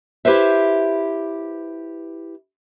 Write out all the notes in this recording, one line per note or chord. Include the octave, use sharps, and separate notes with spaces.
E4 G4 B4 C5 E5